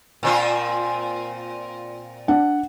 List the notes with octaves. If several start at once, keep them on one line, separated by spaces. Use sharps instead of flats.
A#2 C4 F4
D4 F#5